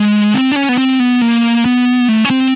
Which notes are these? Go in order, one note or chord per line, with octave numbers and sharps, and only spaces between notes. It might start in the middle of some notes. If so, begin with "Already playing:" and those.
Already playing: G#3
C4
D4
C#4
B3
C4
B3
A#3
B3
A3
C#4
C4